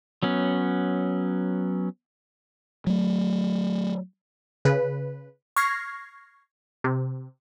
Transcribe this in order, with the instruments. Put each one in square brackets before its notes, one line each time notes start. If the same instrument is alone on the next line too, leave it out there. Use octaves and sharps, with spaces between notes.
[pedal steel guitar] F#3 B3 C#4
[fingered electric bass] F#3 A3
[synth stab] C#3 B4
C#6 F6 G#6 A#6 C7
C3